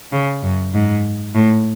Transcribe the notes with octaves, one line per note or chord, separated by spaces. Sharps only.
C#3
F#2
G#2
A2